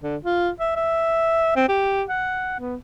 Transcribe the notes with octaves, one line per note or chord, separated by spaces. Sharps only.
D3
F4
E5
E5
C4
G4
F#5
B3